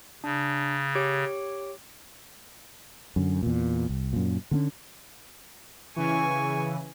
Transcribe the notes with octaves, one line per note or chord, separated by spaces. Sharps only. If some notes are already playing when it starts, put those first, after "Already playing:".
C#3 D4
G4 C#5 D7
F#2 D3
E2 A#2
C2
F#2 A#2
D3 A#3 C#4
C#3 E3 G#5 C#6